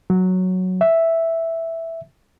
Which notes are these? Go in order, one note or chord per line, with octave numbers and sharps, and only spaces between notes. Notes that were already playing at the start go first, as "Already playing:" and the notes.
F#3
E5